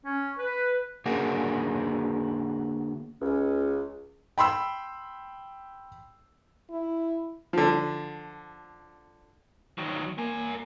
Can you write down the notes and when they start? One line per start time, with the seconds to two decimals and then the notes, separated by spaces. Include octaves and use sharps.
0.05 C#4
0.37 B4
1.06 D3 A#3 F#4 G#4 A#4
3.22 C#2 C#4
4.38 G5 B5 C6 E6
6.71 E4
7.53 D3 F3
9.78 D#3 F#3
10.18 A#3 A#4 G#5